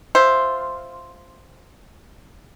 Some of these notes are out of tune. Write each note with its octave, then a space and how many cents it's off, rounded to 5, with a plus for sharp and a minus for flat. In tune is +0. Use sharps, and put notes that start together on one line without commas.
F4 +0 C5 +0 E5 +0